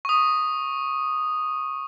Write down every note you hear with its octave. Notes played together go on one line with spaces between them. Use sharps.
C#6 D#6